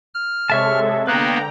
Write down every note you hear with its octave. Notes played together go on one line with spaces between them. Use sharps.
F6
C3 G#3 A4 C#5 E5 A5
D3 A#3 B3 B4 G5 A#5 F#6